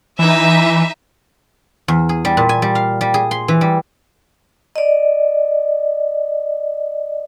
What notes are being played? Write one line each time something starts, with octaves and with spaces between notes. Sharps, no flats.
E3 D#4 E5
E2
G#4
G3
A#2
G#5
G3
F5
G3
G#4
C6
E3
G3
D5 D#5